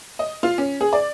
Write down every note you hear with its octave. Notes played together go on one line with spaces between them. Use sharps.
D#5
F4
C#4
G#4
D5